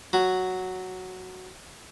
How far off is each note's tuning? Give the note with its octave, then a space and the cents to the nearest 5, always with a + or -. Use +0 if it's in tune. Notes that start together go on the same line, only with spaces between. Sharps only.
F#3 +0 F#4 +0